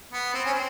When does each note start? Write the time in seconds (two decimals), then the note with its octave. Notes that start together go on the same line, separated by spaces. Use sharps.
0.12 B3
0.34 C4
0.45 C#4
0.54 C4